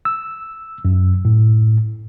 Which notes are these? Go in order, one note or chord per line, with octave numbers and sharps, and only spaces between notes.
E6
F#2
A2